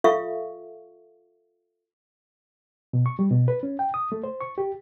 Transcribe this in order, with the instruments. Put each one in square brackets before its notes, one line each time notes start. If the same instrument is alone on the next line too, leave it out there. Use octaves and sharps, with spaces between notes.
[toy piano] F4 A4 E5 F5 C#6
[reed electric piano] B2
C#6
G3
B2
B4
C#4
G5
D#6
A3
C5
C#6
G4